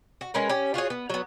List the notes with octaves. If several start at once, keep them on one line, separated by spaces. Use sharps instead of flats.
F#4
G#3 C#4 A#4 B4
C#4 G4
F4 F#4 G#4 C#5
B3
F#3 B3